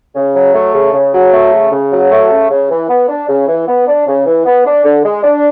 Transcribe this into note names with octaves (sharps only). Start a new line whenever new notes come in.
C#3
F#3
A3
C#3
C#3
F#3
A3
C#3
C#3
F#3
A3
C#3
C#3
E3
B3
D4
C#3
E3
B3
D4
C#3
E3
B3
D4
D3
G#3
D4